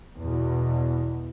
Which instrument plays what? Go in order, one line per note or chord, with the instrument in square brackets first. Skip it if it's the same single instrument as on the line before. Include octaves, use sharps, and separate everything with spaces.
[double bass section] E2 B2